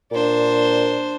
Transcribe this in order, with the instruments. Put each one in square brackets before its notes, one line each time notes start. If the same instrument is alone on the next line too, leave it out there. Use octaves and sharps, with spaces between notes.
[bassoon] A#2 [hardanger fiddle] D4 C5